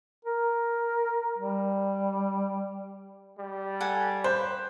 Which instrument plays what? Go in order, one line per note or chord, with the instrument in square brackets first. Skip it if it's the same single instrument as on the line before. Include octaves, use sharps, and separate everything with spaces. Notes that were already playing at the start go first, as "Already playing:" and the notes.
[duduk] A#4
G3
[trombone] G3
[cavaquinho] A4 F#5 G#5
[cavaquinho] B4 [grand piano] C5